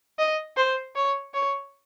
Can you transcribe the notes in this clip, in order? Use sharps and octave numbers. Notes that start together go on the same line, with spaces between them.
D#5
C5
C#5
C#5